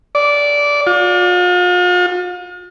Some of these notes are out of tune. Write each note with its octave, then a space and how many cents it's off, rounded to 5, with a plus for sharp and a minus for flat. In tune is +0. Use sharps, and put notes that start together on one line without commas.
D5 -15
F4 +40